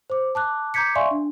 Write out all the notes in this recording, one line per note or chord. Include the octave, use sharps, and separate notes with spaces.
C5 D6
A5 D6 F#6
A#5 D6 G6 G#6 B6 C#7
D5 E5 F5 G#5 C6 C#6
D4